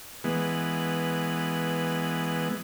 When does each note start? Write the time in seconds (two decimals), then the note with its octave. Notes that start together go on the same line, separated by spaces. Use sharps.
0.24 E3 G#3 B3